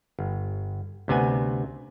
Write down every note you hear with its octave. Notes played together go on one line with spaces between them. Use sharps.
G1
D2 C3 B3 G#5